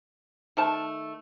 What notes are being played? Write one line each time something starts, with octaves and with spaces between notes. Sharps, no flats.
D#3 A3 A5